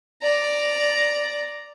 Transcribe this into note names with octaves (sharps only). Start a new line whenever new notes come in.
D5 A#5